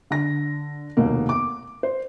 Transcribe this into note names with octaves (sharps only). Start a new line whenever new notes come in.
D3 A#6
F1 D#2 B2 A#3
D6
C5